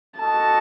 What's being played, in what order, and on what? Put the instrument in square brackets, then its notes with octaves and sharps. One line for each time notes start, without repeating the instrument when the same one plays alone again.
[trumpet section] F#4 A4 D#5 [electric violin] A5